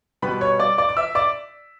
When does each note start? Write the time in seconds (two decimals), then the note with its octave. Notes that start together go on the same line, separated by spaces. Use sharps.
0.22 B2 G3 B3 B4 B5
0.41 C#5 C#6
0.59 D5 D6
0.78 D5 D6
0.89 D6
0.97 E5 E6
1.15 D5 D6